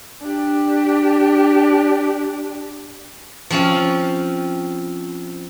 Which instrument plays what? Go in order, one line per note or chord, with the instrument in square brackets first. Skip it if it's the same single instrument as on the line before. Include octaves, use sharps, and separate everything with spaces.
[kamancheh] D4 G4
[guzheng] F3 C4 C#4 F4